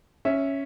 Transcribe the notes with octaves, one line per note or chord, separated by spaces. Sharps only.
C#4 E5